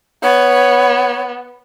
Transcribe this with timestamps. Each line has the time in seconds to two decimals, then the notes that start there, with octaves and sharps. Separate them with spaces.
0.23 B3 C#5